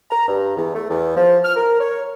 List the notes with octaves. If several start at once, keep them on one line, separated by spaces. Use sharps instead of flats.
A#5
G2
E2
A3
E2
F3
F6
A#4
C#5